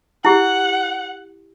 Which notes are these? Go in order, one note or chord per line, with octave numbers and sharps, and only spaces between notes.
E4 G4 F#5